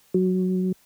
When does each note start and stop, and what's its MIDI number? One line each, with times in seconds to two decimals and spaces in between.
0.14 0.72 54